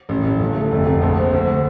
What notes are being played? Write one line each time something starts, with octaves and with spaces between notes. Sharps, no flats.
A1
A1
G1
A3
F1
F1
A#1
C4
D2